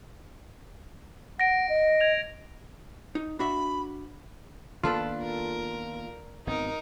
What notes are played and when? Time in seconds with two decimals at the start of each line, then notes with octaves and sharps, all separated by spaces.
1.40 F#5 A#6 D7
1.69 D#5
2.01 G#6 F7
3.15 D#4
3.39 D4 F#4 E5 B5
4.83 D#3 A#3 B3 D4 F4 A4 B4
5.22 A#4
6.47 G#1 B3 C4 D#4 A#4